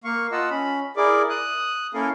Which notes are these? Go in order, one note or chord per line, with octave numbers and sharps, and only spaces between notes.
A#3 F5 C#6
F4 D#5 F#5 A5 E6
C#4 B5
E4 G#4 A#4 D5 D6
D#6 F#6
A#3 C#4 E4 A4 A#4 F5